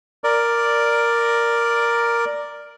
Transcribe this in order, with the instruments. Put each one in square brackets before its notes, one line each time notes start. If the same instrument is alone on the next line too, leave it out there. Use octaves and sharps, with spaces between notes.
[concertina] A#4 D5